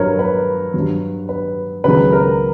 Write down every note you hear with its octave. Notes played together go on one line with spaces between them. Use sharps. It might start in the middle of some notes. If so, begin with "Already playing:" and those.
Already playing: G2 F#3 A#4 B4 C#5
B4
G2 F#3
B4
C#2 C#3 F#3 B4
A#4